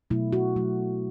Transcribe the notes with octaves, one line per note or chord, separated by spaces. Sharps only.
B2 F#3 A3 E4
F#4
B2 F#3 A3